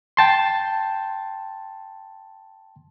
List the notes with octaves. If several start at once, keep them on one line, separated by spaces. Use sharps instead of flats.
G5 A5 C6